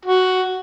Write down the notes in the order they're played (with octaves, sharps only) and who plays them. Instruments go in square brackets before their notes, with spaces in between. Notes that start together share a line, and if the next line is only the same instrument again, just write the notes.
[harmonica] F#4